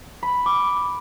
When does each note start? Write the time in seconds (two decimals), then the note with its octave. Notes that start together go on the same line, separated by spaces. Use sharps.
0.23 B5
0.46 D6